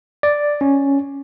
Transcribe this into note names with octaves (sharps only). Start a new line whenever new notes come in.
D5
C#4